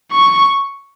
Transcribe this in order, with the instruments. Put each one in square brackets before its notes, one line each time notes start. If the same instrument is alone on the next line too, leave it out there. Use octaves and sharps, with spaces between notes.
[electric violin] C#6